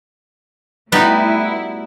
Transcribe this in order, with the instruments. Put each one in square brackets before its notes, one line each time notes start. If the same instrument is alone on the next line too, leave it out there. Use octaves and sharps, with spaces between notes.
[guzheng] G3 [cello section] A3 E4 [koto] B3 D#4 F#4 [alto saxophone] B4